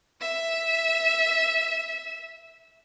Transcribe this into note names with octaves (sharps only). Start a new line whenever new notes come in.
E5 E7